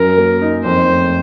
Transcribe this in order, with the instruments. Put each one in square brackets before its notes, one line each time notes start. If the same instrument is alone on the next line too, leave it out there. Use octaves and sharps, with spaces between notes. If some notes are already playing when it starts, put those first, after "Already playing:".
Already playing: [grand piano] F#2 [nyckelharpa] A#4
[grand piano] A#3
D#4
[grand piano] F2 [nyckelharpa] C5
[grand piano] A3